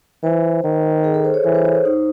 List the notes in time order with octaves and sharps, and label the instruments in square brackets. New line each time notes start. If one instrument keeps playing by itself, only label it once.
[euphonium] E3 [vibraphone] C5
[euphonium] D#3
[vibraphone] G#4
A4
C5
C#5
[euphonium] E3 [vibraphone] C5
[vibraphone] C5
C#5
C5
D#4